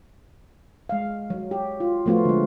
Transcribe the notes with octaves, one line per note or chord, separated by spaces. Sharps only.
G#3 F5
F#3
G4
F4
F3 A3 B3 F4 F#4
D3 G#3